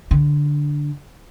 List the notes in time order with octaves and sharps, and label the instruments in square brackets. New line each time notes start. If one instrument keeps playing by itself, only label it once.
[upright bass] D3